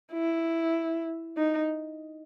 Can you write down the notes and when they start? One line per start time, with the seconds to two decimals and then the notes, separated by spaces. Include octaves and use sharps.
0.13 E4
1.37 D#4